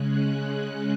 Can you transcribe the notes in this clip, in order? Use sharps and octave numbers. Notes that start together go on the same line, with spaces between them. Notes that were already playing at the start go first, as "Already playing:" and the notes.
Already playing: C#3 G#3 C#4 F#6
F#6